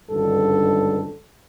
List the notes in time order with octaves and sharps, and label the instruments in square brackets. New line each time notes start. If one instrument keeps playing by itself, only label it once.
[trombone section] G#1 C#2 G2 D3 A4